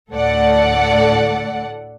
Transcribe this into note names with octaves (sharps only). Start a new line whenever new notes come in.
D2 A2 A4 D5 F#5